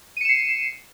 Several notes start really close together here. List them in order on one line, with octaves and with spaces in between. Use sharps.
D#7 C#7 E7 C7